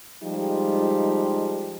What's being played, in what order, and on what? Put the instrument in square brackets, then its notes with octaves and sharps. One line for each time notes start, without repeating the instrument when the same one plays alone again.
[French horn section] F3 G3 G#3 D#4 F4 G4